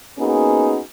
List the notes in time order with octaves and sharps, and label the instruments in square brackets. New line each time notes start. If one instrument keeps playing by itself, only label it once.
[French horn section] A#3 B3 C#4 D#4 F#4 G#4